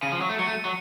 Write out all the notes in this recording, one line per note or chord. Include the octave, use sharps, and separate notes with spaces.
C#3 D#7
F3
F#3
A3
F#3 C#7
A3
F#3